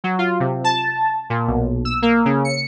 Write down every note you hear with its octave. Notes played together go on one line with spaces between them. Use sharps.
F#3
F4
C3
A5
A#2
B1
E6
A#3
C#3
C#7